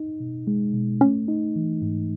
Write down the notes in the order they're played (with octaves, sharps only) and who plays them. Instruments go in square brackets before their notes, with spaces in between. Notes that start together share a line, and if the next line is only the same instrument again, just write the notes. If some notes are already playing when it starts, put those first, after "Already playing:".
Already playing: [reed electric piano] D#4
B2
G#3
B2
[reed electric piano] A3 [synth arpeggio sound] C#4
[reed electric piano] D#4
E3
G#2